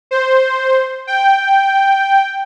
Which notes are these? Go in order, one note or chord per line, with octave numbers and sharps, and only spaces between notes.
C5
G5